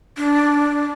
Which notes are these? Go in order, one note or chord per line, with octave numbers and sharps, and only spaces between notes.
D4